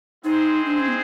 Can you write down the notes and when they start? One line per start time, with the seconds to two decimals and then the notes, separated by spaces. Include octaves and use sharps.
0.24 G#3 C4 D#4 E4 G#4 C5
0.66 D4
0.80 C#4
0.88 B3